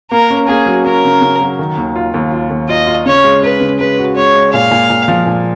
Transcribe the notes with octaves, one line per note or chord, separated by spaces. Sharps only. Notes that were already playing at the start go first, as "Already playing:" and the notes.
A#3 A#4
C#4
A#3 G#4
F#3
C#4 A#4
C#3
C#3
F#3
D#3
D#2
F4
D#2
F4
D#2
F4 D#5
F4
C#3 C#5
G#3
G#3 B4
C#3
G#3 B4
F#4
G#3 C#5
G#3
A#2 F5
A#2
A#2
F3
A#2